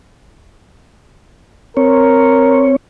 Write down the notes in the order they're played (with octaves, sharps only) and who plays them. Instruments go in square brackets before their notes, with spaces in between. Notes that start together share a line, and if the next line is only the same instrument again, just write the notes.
[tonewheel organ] C4 C#5 [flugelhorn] A#4